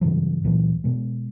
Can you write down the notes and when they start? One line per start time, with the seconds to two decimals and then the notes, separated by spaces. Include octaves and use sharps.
0.01 G2 C#3 E3 F#3
0.44 C#2 A#2 E3 F#3
0.84 B2 G#3